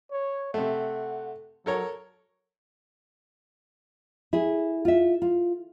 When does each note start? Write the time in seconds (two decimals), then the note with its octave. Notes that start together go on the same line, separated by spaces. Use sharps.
0.12 C#5
0.54 C3 A3 F#5
1.66 F#3 A4 A#4 C#5
4.33 E4 G#4
4.85 F4 E5
5.22 F4